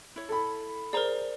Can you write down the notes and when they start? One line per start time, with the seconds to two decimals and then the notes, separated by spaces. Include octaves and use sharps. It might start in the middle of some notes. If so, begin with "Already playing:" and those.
0.16 E4 C#5
0.29 A4 B5
0.93 G#4 A#4 C5 D5 A#5